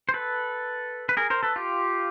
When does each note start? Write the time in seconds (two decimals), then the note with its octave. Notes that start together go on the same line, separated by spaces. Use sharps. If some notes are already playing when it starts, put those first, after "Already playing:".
0.09 C5
0.14 A4 B4
1.09 B4
1.17 G#4 A#4
1.30 A#4 C5
1.43 A4 B4
1.56 F4 G4